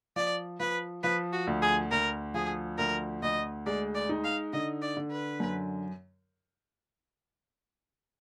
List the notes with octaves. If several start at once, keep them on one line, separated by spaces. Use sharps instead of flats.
F3 D5
F3 B4
F3 B4
F#4
D2
G#4
D2 A#4
F3 G#4
D2 A#4
D2 D#5
G#3 D5
D5
D#4
F5
D3 D#5
D5
D3
B4
F#2